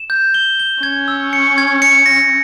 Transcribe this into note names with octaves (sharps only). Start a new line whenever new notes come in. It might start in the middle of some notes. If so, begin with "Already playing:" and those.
Already playing: E7
G6
G7
G7
C#4 G#6
E6
C#7
G#6
C#7
A#6